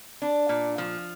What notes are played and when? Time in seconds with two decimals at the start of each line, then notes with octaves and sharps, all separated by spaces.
0.22 D4
0.49 A#2
0.78 F3